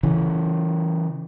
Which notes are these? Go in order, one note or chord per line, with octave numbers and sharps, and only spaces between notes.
C#3 E3